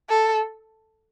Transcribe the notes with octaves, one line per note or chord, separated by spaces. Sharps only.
A4